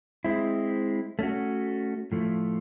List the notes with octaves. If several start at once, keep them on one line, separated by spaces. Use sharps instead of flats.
G#3 C4 E4
A3 C#4 F#4
A2 F3 A3